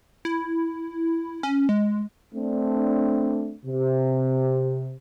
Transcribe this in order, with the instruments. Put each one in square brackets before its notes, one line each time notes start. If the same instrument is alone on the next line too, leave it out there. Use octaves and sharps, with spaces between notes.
[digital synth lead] E4
C#4
G#3
[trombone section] A3 C4 D4
C3